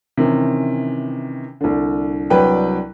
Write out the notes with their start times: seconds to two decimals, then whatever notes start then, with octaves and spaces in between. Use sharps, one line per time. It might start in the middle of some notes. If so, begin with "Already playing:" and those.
0.17 C3 D#3 E3 C#4
1.61 C2 D3
2.30 C2 F#3 D4 B4 G5 B5